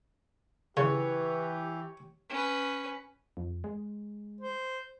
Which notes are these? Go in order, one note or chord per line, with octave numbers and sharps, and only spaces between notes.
C#3 E3 G4 C#5
C#4 B4
F2
G#3
C5